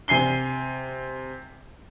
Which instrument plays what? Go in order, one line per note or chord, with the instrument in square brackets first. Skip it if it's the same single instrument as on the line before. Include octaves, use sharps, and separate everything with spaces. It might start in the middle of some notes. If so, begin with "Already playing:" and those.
[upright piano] C3 G#5 C7 G7